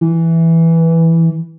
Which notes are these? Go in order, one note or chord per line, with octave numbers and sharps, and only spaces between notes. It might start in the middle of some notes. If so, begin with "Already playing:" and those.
E3